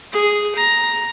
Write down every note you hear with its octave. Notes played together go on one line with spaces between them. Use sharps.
G#4
A#5